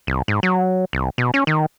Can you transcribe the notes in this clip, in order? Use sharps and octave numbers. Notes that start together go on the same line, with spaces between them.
C2
G#2
F#3
C2
B2
C#4
D#3